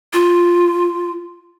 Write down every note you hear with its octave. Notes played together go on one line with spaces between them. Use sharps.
F4